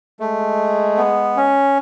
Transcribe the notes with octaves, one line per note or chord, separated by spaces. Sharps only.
G#3 A3
B3
C#4